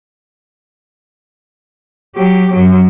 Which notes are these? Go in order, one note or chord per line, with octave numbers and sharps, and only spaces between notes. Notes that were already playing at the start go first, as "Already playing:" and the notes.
F#3 G4
F#2 F#3